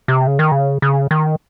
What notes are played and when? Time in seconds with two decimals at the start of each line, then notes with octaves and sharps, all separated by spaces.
0.08 C3
0.27 C#3
0.39 D#3
0.52 C#3
0.82 C#3
1.11 D#3